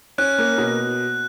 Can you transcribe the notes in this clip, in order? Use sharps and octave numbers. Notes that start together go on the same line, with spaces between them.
C#4 F#6
A#3
B2